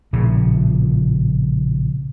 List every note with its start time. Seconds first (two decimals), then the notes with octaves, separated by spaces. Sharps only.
0.13 A#1 A2 C#3